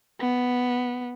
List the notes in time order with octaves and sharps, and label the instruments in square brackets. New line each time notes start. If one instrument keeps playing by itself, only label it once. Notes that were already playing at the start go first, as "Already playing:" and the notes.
[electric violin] B3